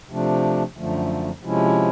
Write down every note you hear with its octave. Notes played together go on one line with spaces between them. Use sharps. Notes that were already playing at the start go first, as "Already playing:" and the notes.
C3 F3 A3 D4
F#2 D3 F3 A3
C3 F3 G#3 C#4 E4